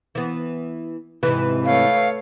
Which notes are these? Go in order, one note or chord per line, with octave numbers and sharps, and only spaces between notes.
E3 B3
G#2 C3 E3 B4
A3 C#5 F5